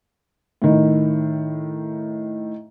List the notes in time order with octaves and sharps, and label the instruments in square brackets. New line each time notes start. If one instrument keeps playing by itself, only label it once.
[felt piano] A2 D#3